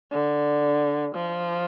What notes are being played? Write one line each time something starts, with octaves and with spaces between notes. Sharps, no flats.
D3
F3